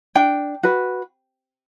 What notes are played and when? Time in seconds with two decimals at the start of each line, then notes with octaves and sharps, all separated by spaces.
0.15 D4 G5
0.63 F#4 B4